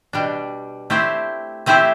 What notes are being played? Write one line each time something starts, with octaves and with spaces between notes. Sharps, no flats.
B2 G3 D4
A3 C4 E4 G4 C5
A3 C4 E4 G4 C5